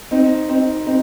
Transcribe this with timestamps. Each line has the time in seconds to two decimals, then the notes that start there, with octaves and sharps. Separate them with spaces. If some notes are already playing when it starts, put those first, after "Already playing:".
0.11 C4 D#4
0.49 C4 D#4
0.86 C4 D#4